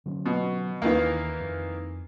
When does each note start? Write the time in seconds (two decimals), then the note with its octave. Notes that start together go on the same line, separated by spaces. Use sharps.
0.06 D3 F#3 C#4
0.26 B2
0.82 D#2 D#3 E3 A#3
1.40 F2